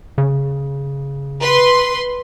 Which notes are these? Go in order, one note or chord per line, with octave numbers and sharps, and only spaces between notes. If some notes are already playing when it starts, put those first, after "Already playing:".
C#3
B4 C6